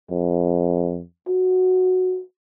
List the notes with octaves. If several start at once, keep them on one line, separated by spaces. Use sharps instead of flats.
F2
F#4